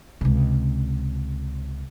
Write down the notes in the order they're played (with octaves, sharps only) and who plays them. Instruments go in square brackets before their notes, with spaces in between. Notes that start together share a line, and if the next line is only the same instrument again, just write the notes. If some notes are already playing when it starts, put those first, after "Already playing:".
[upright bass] C#2 C3